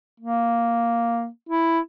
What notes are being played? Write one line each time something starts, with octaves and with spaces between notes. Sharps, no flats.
A#3
E4